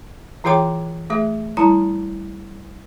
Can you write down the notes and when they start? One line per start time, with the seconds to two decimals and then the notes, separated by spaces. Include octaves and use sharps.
0.44 E3 F4 G#4 C#5 G5 D6
1.10 A3 G#4 E5
1.57 G3 E4 A5 A#5